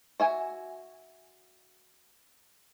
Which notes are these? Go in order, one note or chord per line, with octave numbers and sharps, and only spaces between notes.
F#4 E5 G#5